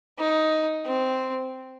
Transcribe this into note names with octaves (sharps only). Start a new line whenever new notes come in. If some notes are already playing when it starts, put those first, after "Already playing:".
D#4
C4